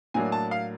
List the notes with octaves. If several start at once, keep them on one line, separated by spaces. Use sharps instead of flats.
A2 F#3 A#3 D4 G#5
A5
F5